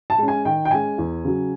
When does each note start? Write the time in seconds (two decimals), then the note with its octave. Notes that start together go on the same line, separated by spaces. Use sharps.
0.10 A5
0.18 G#3 C#4
0.28 G#5
0.45 D#3 G5
0.65 G5
0.71 G#3 C#4 G#5
0.98 E2
1.24 C#3 F#3